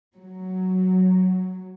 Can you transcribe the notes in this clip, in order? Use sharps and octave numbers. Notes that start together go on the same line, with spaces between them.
F#3